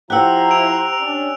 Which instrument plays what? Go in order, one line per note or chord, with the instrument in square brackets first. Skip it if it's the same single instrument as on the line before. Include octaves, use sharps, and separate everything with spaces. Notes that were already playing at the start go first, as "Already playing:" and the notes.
[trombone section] F3 E4 [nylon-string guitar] G4 F#5 [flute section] C5 A#5 [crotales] E6 F#6
[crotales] D7 F7
[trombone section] C#4 D4